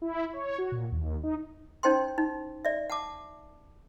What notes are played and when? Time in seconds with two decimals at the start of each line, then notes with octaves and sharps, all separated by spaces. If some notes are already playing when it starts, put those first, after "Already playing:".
0.02 E4
0.33 C#5
0.58 F#4
0.72 A#2
0.92 D#2
1.23 D#4
1.83 C#4 D#4 C5 G5 C6
2.18 D#4
2.65 D5 E5
2.90 F#5 A5 D6